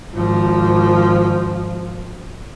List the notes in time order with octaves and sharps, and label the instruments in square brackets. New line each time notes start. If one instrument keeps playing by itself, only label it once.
[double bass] G#1 F3